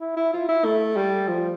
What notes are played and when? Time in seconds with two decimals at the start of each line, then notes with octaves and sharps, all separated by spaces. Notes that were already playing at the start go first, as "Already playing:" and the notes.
0.01 E4
0.17 E4
0.33 F4
0.49 E4
0.64 A3
0.96 G3
1.28 F3